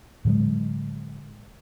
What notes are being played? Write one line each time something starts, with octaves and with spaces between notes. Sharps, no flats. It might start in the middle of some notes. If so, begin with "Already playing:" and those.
A2 D3 F#3 G#3